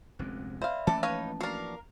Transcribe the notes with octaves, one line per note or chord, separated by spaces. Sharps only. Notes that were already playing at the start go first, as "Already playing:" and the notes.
F1 D2 G#3 C4 C#4
C5 D5 E5 F5 B5
E3 F3 A3 A#3 C#4 A4 D5 A5
D#4 B4 C#5 F5
D4 F#4 A#4 F5